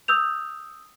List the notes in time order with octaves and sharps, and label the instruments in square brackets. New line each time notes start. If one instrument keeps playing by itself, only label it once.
[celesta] D#6 E6 G6 F7